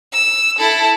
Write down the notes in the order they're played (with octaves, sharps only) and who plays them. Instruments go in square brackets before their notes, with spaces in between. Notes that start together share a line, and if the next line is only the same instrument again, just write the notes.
[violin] E6
E4 A4